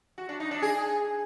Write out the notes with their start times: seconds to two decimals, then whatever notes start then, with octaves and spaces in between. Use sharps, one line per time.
0.18 F#4
0.29 D4
0.40 D#4
0.51 D4
0.62 G#4